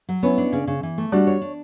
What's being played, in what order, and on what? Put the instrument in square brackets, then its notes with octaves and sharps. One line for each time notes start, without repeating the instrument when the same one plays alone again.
[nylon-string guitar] F#3
[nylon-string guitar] B3 [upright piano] C#4 E4
[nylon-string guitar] D4
C#3
C#3
E3
A3
[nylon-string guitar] G3 [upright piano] D4 F#4
[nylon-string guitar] C#5
D4